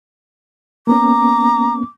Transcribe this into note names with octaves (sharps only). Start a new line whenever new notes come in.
A#3 B3 C#4 A#5 D6